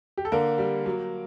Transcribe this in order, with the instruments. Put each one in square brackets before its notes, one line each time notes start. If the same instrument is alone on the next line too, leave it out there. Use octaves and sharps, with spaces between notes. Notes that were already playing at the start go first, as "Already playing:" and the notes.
[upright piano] G4
A4
D3 A#3 A#4
G3
F#3